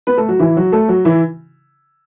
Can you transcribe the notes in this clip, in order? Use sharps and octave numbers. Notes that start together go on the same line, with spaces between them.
B3 B4
A3 A4
F#3 F#4
E3 E4
F#3 F#4
A3 A4
F#3 F#4
E3 E4